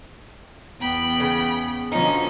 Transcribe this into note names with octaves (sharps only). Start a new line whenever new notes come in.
E2 B3 G5 B5
C#3
B2 D3 F3 C#4 D#4